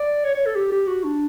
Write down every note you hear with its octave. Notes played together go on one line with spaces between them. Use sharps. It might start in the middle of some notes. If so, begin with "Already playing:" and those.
Already playing: D5
C#5
C#5
A4
G4
G4
F#4
D4